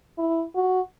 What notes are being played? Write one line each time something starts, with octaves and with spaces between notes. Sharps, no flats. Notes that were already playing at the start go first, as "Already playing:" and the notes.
E4
F#4